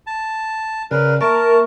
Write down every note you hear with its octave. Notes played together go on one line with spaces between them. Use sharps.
A5
C#3 A#4 B4 D5
A#3 A#4 E5 A5 C#6